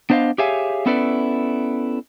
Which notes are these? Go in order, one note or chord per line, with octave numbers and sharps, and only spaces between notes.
B3 D4 C5 D#5 F5
G4 G#4 C#5 E5 F5 G#5
B3 C#4 E4 A4 B4 D5